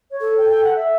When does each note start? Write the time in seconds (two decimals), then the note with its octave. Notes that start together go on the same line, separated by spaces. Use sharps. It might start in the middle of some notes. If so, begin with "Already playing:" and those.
0.11 C#5
0.20 A4
0.38 G5
0.50 G5
0.63 F#5
0.76 E5